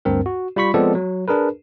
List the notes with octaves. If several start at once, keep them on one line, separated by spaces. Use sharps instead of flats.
D2 G2 C4 A#4
F#4
G3 F4 B5 C#6 B6
F3 G#3 B3 C4 A4 D5
F#3
D4 G#4 A#4 B4